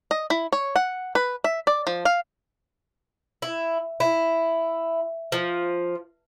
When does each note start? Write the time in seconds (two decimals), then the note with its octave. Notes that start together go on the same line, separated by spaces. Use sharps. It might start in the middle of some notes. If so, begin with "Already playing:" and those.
0.11 D#5
0.30 E4
0.53 C#5
0.76 F#5
1.15 B4
1.44 E5
1.67 D5
1.87 F3
2.05 F5
3.42 E4
4.00 E4
5.32 F3